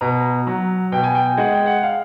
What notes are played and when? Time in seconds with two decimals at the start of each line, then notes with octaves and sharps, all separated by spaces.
0.01 B2 A#5
0.47 F#3
0.92 B2 G5
1.04 G#5
1.15 G5
1.37 G#3 F#5
1.52 G5
1.66 F#5
1.83 F5